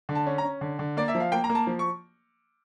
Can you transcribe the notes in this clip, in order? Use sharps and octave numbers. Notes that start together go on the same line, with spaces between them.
D3
A5
C#4
A#5
C#4
D3
D3
A#3 D5
E5
F3
F5
A#3 G5
A#5
A#3
A5
F3
C#6